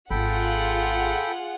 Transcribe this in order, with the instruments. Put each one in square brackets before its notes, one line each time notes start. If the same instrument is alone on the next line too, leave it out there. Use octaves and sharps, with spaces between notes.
[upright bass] G#1 [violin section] F4 G#4 F#5 [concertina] A4 G5 B5